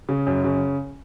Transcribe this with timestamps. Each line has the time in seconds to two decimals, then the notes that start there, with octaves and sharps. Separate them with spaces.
0.09 C#3
0.26 F#2
0.44 C#3